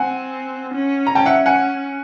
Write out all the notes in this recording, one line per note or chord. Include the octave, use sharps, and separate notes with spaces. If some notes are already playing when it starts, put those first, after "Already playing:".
Already playing: C4 F#5 G#5
C#4
A#5
C#4 G5 A5
E5 F#5
F#5 G#5